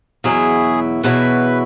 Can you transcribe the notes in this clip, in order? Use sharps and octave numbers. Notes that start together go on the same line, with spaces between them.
E2 B2 F#3 E4 G#4
E2 B2 F#3 E4 B4